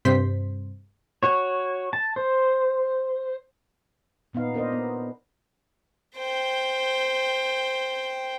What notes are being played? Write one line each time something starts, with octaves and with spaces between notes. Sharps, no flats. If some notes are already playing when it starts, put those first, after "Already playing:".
G2 C3 C5 C6 B6
F#4 C#5
A5
C5
A#2 B3 D#4 F5
D4 A#4 C5 D#5
B3
C5 G5